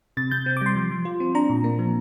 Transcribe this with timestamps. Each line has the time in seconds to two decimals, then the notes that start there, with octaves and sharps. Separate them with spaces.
0.17 C3 A6
0.31 C3 G6
0.46 C4
0.57 D6
0.61 G3 C6
0.76 F3
0.91 F3
1.05 F4
1.20 C4
1.35 D4 A#5
1.49 A#2
1.64 A#3
1.79 F3